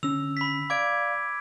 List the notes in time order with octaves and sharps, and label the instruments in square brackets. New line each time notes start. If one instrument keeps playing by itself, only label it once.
[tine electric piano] D3 C#4 [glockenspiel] E6 F7
[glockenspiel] B5 B6
[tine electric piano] D5 F5 [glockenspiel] D6 G#6 D7